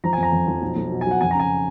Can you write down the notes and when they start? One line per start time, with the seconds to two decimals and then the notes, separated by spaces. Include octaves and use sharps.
0.04 F3 A#5
0.13 G#5
0.17 F2
0.23 A#5
0.32 F2
0.47 F3
0.62 B1
0.77 B1
0.91 B2
1.01 G#5
1.06 F#3
1.11 F#5
1.21 F2 G#5
1.31 A#5
1.35 C#3 G#5